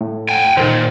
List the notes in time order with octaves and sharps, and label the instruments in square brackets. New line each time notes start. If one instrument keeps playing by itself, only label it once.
[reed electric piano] A2
[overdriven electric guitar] G5 G#5
[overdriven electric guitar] D#2 A#2 [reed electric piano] D#3 C5